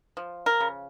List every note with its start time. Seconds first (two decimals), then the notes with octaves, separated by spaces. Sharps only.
0.17 F3
0.46 A#4
0.60 C#3